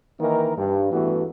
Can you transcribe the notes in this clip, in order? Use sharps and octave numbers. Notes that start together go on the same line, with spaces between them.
D#3 E3 A#3 D#4 A#4
G2
A1 G2 E3 A3 B3 F#4